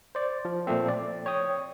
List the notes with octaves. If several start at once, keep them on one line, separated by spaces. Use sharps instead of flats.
C5 D5
F3
A#2 F3 A3 C4
D5
C#5 G5 D#6